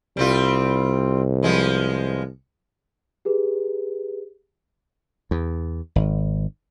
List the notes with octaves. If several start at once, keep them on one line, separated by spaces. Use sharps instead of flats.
C2 G3 C4 F4
F3 G#3 B3
G4 G#4 B4
E2
G#1